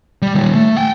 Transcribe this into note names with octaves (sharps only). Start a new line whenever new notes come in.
G3
D#3 G3
A3
F#5 G5